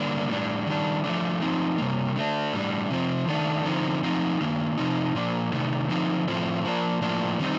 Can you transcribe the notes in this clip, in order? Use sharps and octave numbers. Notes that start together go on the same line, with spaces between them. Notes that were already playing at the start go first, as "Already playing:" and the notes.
Already playing: D3 G3 A#3 D4
A2 G3 D4
D#3 G3 D4
F3 A3 D4
F3 C4 D#4
C3 G3 A#3
D3 A3 D4
A2 G3 D4
C3 F3 C4
D#3 A3 D4
D3 F3 C4 D#4
F3 C4 D#4
D#3 A#3 D4
C3 F3 C4 D#4
A#2 F3 A#3 D4
C3 D#3 A3 D4
D3 F3 C4 D#4
A2 F3 A3 C4
F3 A#3 D4
A2 F3 A#3 D4
D#3 G3 C4 D#4